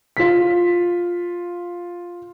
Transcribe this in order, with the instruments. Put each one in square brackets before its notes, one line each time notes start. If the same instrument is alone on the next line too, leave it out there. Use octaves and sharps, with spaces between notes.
[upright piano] F4 B6